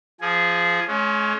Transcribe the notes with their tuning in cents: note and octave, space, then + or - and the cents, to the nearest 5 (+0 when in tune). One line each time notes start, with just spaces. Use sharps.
F3 -15 G#4 +5
G#3 +40 C#4 +10